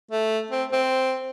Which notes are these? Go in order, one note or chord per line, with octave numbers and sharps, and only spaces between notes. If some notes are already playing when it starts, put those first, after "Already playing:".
A3
C4
C4